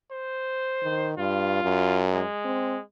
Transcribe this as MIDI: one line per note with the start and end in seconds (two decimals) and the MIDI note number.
0.11 1.11 72
0.83 1.17 51
1.18 1.59 43
1.18 2.05 65
1.63 2.23 42
2.13 2.83 56
2.45 2.77 60